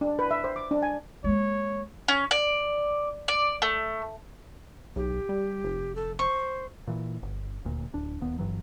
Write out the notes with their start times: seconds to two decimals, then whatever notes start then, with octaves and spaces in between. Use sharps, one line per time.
0.01 D4
0.19 B4
0.31 E5
0.44 C5
0.56 D6
0.71 D4
0.82 G#5
1.24 G#3 A#3 C#5
2.08 C#4
2.31 D5
3.28 D5
3.62 A3
4.96 B1 G4
5.29 G3
5.64 F1
5.95 A4
6.19 C5 C#6
6.88 A#2 E3
7.23 G1
7.65 D#1 D2 A#2
7.93 D1 D4
8.21 D1 D#2 B3
8.38 G1 G2 E3 F#3